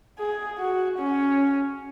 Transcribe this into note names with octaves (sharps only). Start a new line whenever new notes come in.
G#4
F#4
C#4